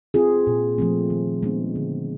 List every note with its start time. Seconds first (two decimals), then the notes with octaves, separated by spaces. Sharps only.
0.14 C4 F4 G#4
0.47 A#2
0.78 F3 A3 C4
1.10 D#3
1.43 G#3 B3 D4
1.76 D3